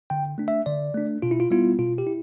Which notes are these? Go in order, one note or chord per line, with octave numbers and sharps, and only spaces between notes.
D3 G5
A3 D4
E5
D3 D5
A3 D4
B2 F4
E4
F4
G3 B3 E4 F4
B2 F4
G4
E4